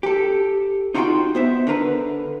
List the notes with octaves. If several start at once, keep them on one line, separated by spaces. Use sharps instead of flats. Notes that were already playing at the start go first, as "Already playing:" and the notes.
G4 A4
D#4 F4 F#4 D#5 G5 C6
B3 C5 E5
D3 D4 A#4 B4